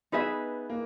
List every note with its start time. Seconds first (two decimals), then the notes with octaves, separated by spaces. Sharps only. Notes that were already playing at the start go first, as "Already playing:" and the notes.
0.12 B3 D#4 G#4 B4 E5
0.70 A#3